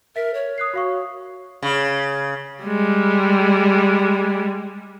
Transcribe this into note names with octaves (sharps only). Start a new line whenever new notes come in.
A#4 E5 B6
C#5
D#6 F#6 C7
F#4 F5 C#6
C#3
G3 G#3